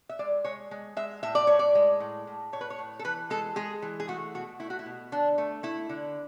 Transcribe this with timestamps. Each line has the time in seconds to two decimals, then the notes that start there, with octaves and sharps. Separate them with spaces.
0.09 E5
0.19 G#3 D5
0.44 G#3 C#5
0.71 G#3
0.96 G#3 E5
1.23 A2 E5
1.35 D5
1.47 A2 C#5
1.59 D5
1.75 G#3
2.00 A2
2.27 A2
2.53 A2 C#5
2.61 B4
2.70 C#5
2.79 A2
2.99 A4
3.04 E3 B4
3.30 G#3 A4
3.56 G#3 G#4
3.82 E3
4.00 G#4
4.08 A3 F#4
4.35 B2 F#4
4.60 A3 E4
4.70 F#4
4.79 E4
4.86 B2
5.12 D3 D4
5.38 A3
5.63 A3 E4
5.89 D3